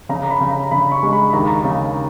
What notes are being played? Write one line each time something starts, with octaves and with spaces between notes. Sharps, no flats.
C#3 A#5
B5
C#3
A#5
C#3 B5
C#6
G#3
B5
D#2 A#5
C#3